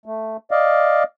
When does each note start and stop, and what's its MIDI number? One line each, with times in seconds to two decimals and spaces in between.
0.06 0.37 57
0.51 1.04 74
0.51 1.04 75
0.51 1.04 77